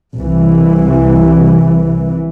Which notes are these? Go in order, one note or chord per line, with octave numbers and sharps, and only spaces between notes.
C2 E3